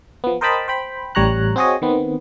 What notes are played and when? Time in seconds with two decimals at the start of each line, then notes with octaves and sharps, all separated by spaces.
0.24 F3 B3
0.41 A#4 C5 D#5 G5 A5 B5
0.68 C5 G5 B5
1.15 A1 G3 C#5 A#5 F#6
1.56 C4 F#4 G#4 C#5 D#5
1.82 D#3 B3 C4